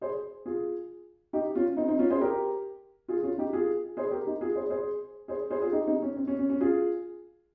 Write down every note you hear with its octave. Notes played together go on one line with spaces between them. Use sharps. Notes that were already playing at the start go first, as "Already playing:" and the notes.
G#4 C5
F4 G#4
D#4 G4
C#4 F4
C4 D#4
C4 D#4
C#4 F4
G#4 C5
G4 A#4
F4 G#4
C#4 F4
D#4 G4
F4 G#4
G#4 C5
G4 A#4
D#4 G4
F4 G#4
G#4 C5
G#4 C5
G#4 C5
G#4 C5
F4 G#4
D#4 G4
C4 D#4
C#4
C4
C#4
C#4
C#4
F4 G#4